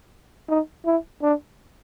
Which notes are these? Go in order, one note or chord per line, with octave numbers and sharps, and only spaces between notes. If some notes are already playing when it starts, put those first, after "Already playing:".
D#4
E4
D4